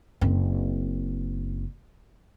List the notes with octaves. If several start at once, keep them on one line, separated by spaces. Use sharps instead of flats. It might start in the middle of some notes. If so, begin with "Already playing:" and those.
F#1 C4